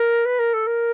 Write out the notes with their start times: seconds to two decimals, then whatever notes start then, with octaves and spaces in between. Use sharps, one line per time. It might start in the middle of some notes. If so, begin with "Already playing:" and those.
Already playing: A#4
0.25 B4
0.39 A#4
0.53 A4
0.67 A#4